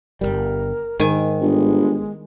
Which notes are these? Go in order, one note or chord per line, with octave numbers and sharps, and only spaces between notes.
G1 D#2 G3 A#4
G#2 D#3 G#5
G1 G#3